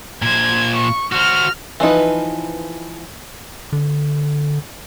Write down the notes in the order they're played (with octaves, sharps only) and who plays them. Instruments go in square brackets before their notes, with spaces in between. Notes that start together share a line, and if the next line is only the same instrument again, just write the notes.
[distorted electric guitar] A#2 C5 [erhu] G#6
[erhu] C#6
[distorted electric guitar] F#4 C5 [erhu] F6
[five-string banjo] E3 F3 D#4 B4
[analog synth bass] D3